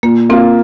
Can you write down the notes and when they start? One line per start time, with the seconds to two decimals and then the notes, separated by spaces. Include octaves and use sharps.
0.03 A#2 A#3
0.29 A#3 C4 F4